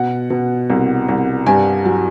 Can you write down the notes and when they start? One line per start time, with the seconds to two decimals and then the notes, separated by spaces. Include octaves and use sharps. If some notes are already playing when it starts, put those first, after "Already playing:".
Already playing: B2 F#5
0.30 B2
0.70 C2
1.08 C2
1.46 G2 G#5
1.85 F#3